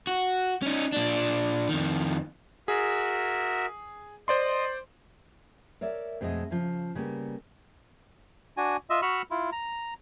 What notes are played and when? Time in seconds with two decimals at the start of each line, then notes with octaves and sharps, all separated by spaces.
0.07 F#4
0.62 C#4 D#4
0.93 A#2 D4
1.69 F2 D#3
2.68 F#4 G#4 A#4 E5
4.28 C5 D5 D#5 C6
5.81 A#4 C#5 D5 E5
6.21 F2 B2 G#3 A3 D#5 E5
6.51 C#3 F3
6.95 C#3 G3 A#3 B3
8.57 D4 F#4 G#5
8.90 F4 D#5 E5
9.02 F#4 B5 C#6 E6 F6
9.31 E4 F4
9.52 A#5